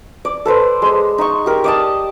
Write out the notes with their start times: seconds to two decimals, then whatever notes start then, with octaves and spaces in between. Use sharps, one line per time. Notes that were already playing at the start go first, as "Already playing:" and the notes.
0.25 D5
0.45 A4 B4 C5
0.82 G#3 C5
1.18 D#4 C#6
1.46 G4 A#4
1.64 D5 D#5 A5